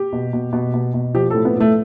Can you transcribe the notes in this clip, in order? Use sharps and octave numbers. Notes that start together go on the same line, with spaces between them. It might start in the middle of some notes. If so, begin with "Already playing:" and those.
Already playing: G4
B2
B2
B2
B2
B2
F3 G4
A2 A4
B3
A2 A3